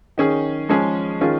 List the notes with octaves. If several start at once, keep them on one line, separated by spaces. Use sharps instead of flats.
D#3 C#4 G#4
F3 G#3 C#4 G#4
D#3 C#4 F4 G#4